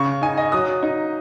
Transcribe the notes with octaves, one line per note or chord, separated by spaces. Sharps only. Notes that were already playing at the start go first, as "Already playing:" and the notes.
Already playing: C#3 C#6
D#4 G#5
D#5
F#3 D#6
D#4